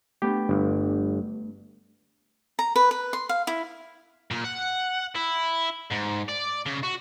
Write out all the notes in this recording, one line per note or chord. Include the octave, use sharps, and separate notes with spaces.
A3 B3 D4 G4
G1
A#5
B4
B4
C6
F5
E4
A#2
F#5
E4
G#2
D5
C#3
F#4